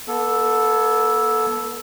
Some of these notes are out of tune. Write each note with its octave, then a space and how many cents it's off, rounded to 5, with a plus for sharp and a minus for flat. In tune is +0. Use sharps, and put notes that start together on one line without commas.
B3 -45 A4 -5